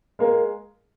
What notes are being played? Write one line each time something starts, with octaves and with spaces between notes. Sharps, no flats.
G#3 A#3